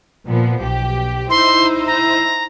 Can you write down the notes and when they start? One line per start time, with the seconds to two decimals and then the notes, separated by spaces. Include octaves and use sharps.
0.24 A#2 F3 B3
0.59 B1 G4
1.30 D#4 E4 C5 C6
1.87 A#5